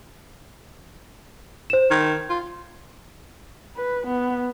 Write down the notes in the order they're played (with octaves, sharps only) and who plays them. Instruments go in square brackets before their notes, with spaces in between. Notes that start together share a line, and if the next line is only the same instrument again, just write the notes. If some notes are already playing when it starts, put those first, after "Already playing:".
[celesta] C5 E7
[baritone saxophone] D#3 [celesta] G#6
[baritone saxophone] F4
[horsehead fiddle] B4
B3